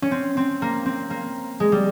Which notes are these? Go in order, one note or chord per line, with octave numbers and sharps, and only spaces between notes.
C#4
C4
C4
A#3
C4
A#3
G#3
G3